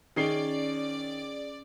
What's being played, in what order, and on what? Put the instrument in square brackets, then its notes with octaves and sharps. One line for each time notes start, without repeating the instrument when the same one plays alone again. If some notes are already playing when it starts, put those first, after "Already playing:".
[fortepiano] D#3 [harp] C#4 [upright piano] G#4 C7 G7 [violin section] D5